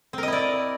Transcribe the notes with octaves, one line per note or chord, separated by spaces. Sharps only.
C4 E4 A#4 D5 D#5